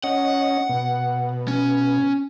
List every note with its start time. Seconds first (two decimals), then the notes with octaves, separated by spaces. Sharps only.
0.04 C#4 D#5 F#5
0.69 B2
1.48 C#4